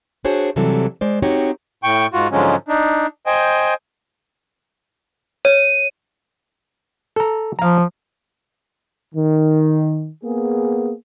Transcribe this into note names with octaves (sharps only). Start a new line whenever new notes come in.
D4 F#4 G#4 C5 C#5
C3 E3 F#3 G3 C4 A4
G#3 C5 D5
C4 D#4 F#4 G4 C#5
A2 G5 C#6
G#2 F4 F#4
G#2 D3 F3 F#3 G#3 C#4
D4 D#4
C5 D#5 G5 G#5
C#5 D#7
A4 A#5
F3 F5 A#5
D#3
A#3 B3 G#4